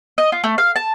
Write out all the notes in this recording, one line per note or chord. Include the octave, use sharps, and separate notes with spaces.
D#5
F4
A3
F5
A5